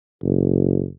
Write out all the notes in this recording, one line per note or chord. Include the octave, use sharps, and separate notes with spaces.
F#1